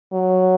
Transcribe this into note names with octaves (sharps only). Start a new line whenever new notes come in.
F#3